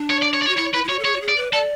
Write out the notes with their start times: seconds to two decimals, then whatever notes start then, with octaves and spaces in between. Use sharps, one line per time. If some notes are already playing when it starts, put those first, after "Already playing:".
Already playing: D4
0.10 C#5
0.22 D5
0.34 C#5
0.42 D5
0.46 C#5
0.48 F#4
0.57 E4 C#5
0.74 E4 B4
0.84 E4
0.89 F#4 C#5
0.99 A4
1.05 G#4 C#5
1.16 F#4
1.21 G#4
1.28 D5
1.37 B4
1.52 A4 D5